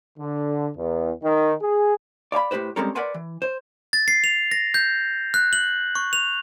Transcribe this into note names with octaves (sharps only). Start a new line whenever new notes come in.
D3
E2
D#3
G#4
D5 F5 G#5 B5
A2 D4 G4 B4 C5
G3 G#3 C4 C#4 A4 A#4
A#4 B4 D5 F#5 G#5 C6
E3
C5
A6
C7
F7
A#6
G6
F#6
F#7
C#6
F7